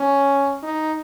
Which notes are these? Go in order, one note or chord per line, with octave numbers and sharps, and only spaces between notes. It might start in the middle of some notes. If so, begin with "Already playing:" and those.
Already playing: C#4
D#4